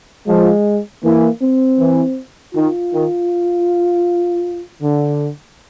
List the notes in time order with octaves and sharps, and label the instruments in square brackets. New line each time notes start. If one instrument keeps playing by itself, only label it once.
[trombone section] F3 [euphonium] G#3
[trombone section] E3 [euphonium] A#3
[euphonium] C4
[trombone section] E3
[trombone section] D#3 [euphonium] F4
[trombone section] D#3
D3